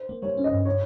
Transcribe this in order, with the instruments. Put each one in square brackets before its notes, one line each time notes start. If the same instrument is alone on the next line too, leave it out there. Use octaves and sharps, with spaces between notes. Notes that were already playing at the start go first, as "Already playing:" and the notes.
Already playing: [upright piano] C5
[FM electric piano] A#3
[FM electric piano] G3 [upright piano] C#5
[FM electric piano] C#4
[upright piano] D#5
[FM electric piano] G2
[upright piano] C#5